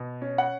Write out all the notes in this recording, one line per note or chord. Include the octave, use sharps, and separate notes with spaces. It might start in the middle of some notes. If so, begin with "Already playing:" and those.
Already playing: B2
C#4
F#5